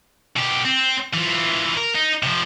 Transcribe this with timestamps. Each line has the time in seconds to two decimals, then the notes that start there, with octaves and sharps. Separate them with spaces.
0.37 B2 G4
0.65 C4
1.14 E3 F4
1.77 A#4
1.95 D#4
2.23 C3 F3